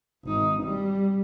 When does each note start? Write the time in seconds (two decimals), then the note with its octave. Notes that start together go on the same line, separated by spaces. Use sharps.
0.24 G#1 D#4
0.63 G3